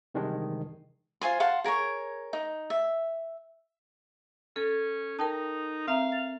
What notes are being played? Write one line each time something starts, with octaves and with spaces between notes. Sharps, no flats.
C3 D#3 E3 G3 G#3 D4
F4 C5 G#5 C6
F5 F#5 A5 C6
G#4 A#4 B4 C#5
D#4
E5
C#4 A4
D#4 A#4 G5 A5
C4 E5 F5 A#5
A6